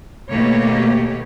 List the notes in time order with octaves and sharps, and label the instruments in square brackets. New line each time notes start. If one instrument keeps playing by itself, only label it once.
[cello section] D#2 B2 A3 A#3 G4 C#5